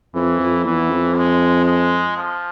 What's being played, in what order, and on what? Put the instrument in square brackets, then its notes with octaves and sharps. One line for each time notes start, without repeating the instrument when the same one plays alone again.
[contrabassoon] F2 [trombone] E3
[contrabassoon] F2
[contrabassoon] E2 [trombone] E3
[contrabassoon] F2
[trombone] G#3
G#3
F3